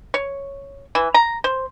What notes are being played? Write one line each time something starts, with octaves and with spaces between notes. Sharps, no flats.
C#5
E3
A#5
C5